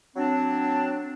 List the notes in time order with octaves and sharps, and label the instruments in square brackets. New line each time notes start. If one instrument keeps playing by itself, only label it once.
[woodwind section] F#3 C4 D4